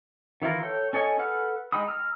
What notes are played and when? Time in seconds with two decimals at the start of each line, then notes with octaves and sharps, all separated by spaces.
0.42 D#3 E3 E4 F4 A#4
0.62 A4 C#5 G5
0.93 C#4 A4 C#5 D#5 G#5
1.19 A4 B4 F#5 F6
1.72 G#3 D#4 G5 B5 D#6
1.88 A#5 E6 F6